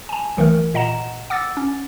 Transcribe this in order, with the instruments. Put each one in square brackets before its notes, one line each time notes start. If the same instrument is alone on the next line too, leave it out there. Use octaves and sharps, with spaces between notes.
[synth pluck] G#5 A5
B1 D#3 E3 A3 A#4
A#2 D#5 F#5 A#5 E7
F#5 D6 E6 A6
C#4